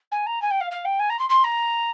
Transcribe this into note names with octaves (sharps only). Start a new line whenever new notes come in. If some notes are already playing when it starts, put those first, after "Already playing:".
G#5
A#5
G#5
G5
F5
F5
G5
G#5
A#5
C6
C6
A#5